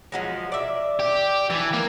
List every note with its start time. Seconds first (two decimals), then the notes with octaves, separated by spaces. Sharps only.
0.12 F3 F#3 G#3
0.52 D5 E5
0.99 G4
1.50 E3 A5
1.73 A#3